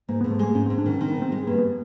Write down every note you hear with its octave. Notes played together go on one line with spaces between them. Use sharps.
G#2 A#3
G#2 B3
A3
G#3 A#3
G#2 C#4
G#2 C4
D4
D#3 C#4
D#3 C4
G#2 B3
C4
G#3
G2 A#3
B3